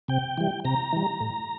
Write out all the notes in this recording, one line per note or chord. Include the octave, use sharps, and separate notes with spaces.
C3 G5
E3 G3
C3 A#5
E3 G3
A2